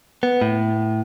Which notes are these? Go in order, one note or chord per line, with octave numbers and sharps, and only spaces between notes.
B3
A2